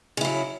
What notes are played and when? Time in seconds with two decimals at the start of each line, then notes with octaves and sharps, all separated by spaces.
0.17 C#3
0.21 E4
0.25 F#3